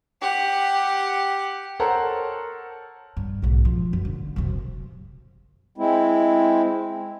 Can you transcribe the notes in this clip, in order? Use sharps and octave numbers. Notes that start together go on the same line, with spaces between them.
G4 F#5
A4 A#4 C5 C#5 F#5 A#5
G2
B1 G#2
F3
F#2
D3
F#2 C3
G#3 C4 E4